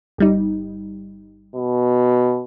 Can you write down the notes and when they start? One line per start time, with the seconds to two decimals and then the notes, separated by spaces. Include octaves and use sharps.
0.18 G1 G3 D#4
1.55 B2